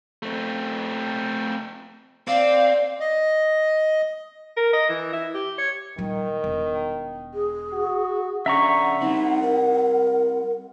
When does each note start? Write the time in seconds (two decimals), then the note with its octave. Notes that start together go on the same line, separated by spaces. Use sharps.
0.23 A3 C4
2.28 C4 D5 F5
3.00 D#5
4.57 A#4
4.73 D#5
4.89 E3
5.13 E4
5.34 G4
5.58 C#5
5.98 A#2 D#3 G3
6.44 E1
7.34 G#4
7.73 F#4
8.46 C#3 D4 E5 F#5 A#5 C#6
9.01 G3 C4 D#4
9.42 A#4